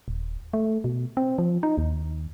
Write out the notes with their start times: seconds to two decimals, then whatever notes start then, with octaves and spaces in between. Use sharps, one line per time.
0.08 D#1
0.53 A3
0.84 B2
1.17 C4
1.38 F3
1.63 D#4
1.78 D#2